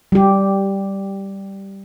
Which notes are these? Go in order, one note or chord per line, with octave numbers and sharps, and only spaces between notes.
G3 G4